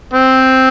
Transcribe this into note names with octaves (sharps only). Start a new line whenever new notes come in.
C4